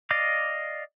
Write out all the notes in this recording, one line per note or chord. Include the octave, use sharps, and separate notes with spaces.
D5 D#5 F5 D6